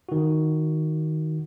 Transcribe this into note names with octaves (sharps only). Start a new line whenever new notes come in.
D#3 F#4